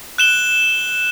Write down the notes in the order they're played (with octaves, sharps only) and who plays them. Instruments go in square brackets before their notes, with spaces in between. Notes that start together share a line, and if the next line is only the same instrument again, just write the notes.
[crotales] F#6 E7 G7